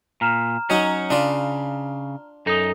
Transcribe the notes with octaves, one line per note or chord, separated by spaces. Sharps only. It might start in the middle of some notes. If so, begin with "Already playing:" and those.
A#2 A#5 F6 E7
F#3 C#4 D#4 F#4
C#3 D4 F4 D5
F#2 D#4 A4 D#6